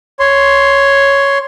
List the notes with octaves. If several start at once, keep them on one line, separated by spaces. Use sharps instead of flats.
C#5 C6